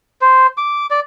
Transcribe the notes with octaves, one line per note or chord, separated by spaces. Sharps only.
C5
D6
D5